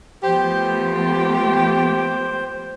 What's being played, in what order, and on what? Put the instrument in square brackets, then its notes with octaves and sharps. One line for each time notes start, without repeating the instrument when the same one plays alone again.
[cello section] F3 A3 B3 [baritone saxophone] G4 [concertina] C5